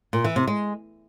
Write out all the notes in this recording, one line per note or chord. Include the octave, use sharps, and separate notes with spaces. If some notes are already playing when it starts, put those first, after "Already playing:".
A#2
E3
C3
G#3